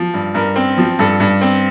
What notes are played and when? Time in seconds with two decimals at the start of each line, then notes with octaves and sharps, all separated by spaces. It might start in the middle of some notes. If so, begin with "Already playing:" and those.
Already playing: F3
0.14 G2
0.34 G2 A#4
0.56 C4
0.78 F3
0.99 G2 A4
1.20 G2
1.41 C4